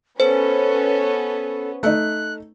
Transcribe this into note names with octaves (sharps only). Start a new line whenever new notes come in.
B3 C#4 A4 C5
A3 D#4 F#6